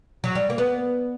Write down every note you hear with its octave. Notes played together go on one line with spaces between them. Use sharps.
F#3
G3
A#3
B3